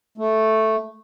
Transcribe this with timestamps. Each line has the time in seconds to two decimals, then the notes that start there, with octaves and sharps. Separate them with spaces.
0.18 A3